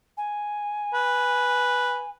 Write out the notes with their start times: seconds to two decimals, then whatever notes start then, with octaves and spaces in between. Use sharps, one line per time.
0.17 G#5
0.94 B4